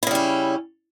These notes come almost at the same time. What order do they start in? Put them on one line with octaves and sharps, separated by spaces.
E4 C#3 G3 C#4